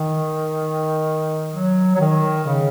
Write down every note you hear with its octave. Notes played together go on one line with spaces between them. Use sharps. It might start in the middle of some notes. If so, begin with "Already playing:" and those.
Already playing: D#3
F#3
F#3
D#3
C#3